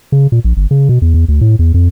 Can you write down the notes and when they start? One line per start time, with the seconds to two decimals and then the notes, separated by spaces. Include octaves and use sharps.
0.12 C#3
0.32 A#2
0.44 A#1
0.57 G1
0.71 C#3
0.89 B2
1.02 E2
1.14 E2
1.28 D2
1.41 A2
1.59 E2
1.74 F2